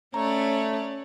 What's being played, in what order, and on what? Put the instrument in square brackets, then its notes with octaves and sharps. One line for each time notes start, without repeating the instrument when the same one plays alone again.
[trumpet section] A3 [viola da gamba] C#4 C#5 D5 [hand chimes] A#5